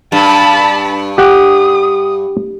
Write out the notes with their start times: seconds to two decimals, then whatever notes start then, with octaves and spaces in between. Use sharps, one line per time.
0.12 G2 A5 B5
1.18 G4 F#5 D#6